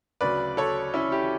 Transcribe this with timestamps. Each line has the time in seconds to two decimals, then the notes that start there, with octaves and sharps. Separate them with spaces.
0.21 D2 C#3 F#3 B4 D5
0.57 A4 C#5
0.94 C#4 E4
1.12 E4 G4